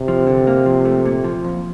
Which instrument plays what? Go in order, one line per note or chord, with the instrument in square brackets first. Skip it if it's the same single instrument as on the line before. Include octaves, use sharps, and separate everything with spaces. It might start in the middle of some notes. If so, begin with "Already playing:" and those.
Already playing: [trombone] C3
[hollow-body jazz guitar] F3
D3
A#3
F3
A3
A#2
F3
F2